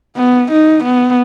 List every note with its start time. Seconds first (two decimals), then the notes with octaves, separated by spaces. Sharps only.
0.17 B3
0.52 D#4
0.84 B3